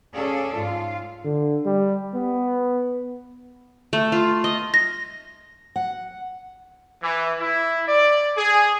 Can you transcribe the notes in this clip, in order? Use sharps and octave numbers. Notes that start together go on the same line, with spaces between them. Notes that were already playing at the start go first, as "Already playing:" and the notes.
C#4 G#4 A4 D5 F5
G#2 F4 F5
D3
G3
B3
A3
F4
D#5
A#6
F#5
E3
E4
D5
G#4